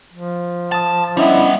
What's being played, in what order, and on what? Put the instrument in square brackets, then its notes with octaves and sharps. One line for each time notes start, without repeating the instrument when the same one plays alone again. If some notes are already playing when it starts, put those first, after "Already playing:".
[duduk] F3
[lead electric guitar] A5 [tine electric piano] D#6 A6
[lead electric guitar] G3 B3 [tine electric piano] C#4 D4 D#5 [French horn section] E4